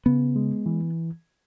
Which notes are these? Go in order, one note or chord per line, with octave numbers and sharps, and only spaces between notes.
C#3 B3
G#3
E3